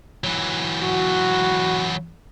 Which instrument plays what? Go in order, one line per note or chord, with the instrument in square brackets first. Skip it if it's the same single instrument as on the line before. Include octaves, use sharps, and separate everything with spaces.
[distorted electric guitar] E3 F#3
[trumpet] F#4